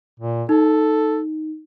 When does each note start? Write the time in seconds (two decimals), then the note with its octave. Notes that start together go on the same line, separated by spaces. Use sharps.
0.20 A#2
0.49 D#4 A4